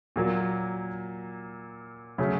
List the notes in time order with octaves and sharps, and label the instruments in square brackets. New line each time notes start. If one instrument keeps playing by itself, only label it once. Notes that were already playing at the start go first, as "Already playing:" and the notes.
[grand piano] A#2 F#3 A#3
C#3 F#3 A3 C#4